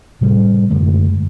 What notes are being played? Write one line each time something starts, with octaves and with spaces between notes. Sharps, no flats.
A2 C3 G3
F#2 D3 G#3 A3